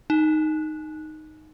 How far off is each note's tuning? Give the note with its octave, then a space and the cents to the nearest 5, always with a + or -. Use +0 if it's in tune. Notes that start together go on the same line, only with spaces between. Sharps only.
D#4 -5